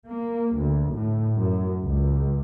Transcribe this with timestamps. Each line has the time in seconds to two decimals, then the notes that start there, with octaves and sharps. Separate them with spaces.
0.10 A#3
0.57 D2
0.93 A2
1.37 F#2
1.82 C#2